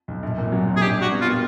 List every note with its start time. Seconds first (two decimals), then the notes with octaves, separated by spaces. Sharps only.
0.08 B1
0.23 A#1
0.38 A#2
0.52 F#3
0.68 A#1
0.76 G#4
0.82 D4 G4
0.98 G3 F#4
1.12 B3
1.21 F4
1.27 A#2